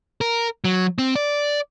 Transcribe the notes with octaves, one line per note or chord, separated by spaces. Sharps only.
A#4
F#3
C4
D5